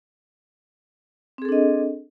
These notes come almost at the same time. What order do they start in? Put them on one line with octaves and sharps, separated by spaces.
C4 G#4 A4 D4 D#5